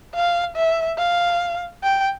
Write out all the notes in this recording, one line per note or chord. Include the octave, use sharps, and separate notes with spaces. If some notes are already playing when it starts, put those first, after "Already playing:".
F5
E5
F5
G5